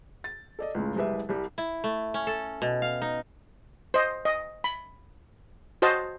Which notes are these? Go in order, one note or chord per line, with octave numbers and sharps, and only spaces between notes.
A6
A4 D5 D#5
C#2 A2 C#3
F#1 C2 G#3 G4 B4 E5
C2 G3
E4
A3
C#4
A4
B2
F5
D#4
C5 D#5
D#5
B5
F#4 C5 D#5 A5